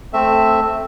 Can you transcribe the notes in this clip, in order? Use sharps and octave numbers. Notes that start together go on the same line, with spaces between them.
A3 C4 E5